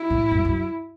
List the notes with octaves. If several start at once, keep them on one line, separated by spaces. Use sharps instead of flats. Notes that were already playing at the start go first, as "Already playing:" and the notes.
Already playing: E4
A2
F#2
F#2